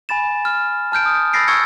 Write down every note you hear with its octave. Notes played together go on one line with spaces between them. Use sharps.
G#5 B5 A6 E7
F6
A5 F6 G6 D7
D#6
B5 E6 A6 A#6 C7 D7
C#6 E6 G#6 C#7